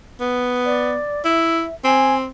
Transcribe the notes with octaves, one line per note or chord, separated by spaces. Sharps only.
B3
D5
E4 E5
C4 G#5